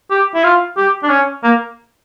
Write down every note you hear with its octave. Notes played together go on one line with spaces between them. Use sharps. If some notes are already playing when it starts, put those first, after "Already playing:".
G4
E4
F4
G4
D4
C#4
A#3